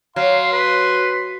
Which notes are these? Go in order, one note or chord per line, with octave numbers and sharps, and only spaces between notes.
F#3 F5 C6
B4